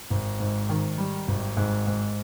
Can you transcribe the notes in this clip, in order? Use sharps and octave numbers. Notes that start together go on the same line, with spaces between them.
G#1
G#2
D#3
G3
G#1
G#2
G#2